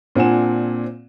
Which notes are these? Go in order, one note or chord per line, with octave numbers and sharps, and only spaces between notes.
A#2 C4 D4 F#5 G#5 E7